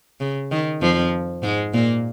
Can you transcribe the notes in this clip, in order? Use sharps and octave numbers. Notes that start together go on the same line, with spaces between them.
C#3
D#3
F2 F3
G#2 G#3
A#2 A#3